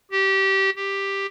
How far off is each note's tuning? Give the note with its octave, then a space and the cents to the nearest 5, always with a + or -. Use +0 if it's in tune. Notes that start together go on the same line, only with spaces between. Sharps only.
G4 -20
G4 +5